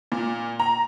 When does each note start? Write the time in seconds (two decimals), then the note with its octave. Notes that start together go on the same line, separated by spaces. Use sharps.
0.12 A#2
0.60 A#5